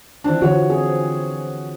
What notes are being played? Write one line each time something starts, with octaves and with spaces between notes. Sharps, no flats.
E3 C4 D4
D3 E3 F3 F#4 C#5
C4 G#4